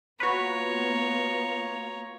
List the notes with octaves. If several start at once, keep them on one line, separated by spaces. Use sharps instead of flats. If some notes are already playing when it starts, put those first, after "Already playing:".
A#3 B3 F4 F#4 B4 C#5 A#5